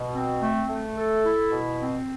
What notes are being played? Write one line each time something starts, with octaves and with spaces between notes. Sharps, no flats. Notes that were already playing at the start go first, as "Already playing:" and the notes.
Already playing: B2
C4
A3
A3
A4
E4
B2
C4